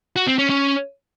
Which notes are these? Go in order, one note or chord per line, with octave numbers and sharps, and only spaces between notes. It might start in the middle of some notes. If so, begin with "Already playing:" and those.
F#4
C4
C#4
C#4